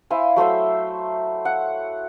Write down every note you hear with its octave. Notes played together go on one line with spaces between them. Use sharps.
E4 C5 F5 G#5
F#3 A3 C5 E5
F#5